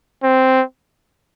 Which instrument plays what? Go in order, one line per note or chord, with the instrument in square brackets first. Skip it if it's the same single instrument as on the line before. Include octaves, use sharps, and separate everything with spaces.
[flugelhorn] C4